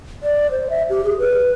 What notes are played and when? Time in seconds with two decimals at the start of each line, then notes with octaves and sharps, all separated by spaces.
0.23 D5
0.51 C5
0.70 E5
0.90 G4
1.04 G#4
1.19 B4